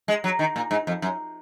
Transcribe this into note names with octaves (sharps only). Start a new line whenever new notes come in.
G#3
F#3
D#3
A#2
G#2
F2
F#2